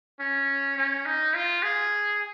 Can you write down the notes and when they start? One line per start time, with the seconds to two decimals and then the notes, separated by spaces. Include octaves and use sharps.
0.20 C#4
0.78 C#4
1.06 D#4
1.34 F4
1.63 G#4